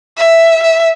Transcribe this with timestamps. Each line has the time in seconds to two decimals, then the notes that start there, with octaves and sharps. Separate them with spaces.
0.17 E5
0.63 E5